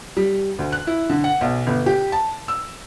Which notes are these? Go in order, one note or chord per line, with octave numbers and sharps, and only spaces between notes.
G3
D2
F#6
E4
D3
F#5
B1
G1
G4
A5
E6